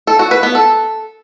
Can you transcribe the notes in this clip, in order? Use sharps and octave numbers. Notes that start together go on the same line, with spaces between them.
A4
F#4
B4
B3
A4